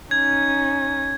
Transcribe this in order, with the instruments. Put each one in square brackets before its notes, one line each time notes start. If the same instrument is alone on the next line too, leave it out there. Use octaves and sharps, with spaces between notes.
[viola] C#4 D#4 [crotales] G#6